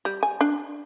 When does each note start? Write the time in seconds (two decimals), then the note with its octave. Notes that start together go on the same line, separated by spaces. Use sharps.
0.05 G3
0.23 G#5
0.41 D4